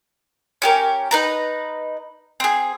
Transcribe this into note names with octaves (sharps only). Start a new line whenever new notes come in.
C#4 G4 A#4
D#4 B4 A#5
C4 G#4